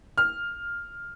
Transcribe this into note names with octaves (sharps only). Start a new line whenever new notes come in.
F6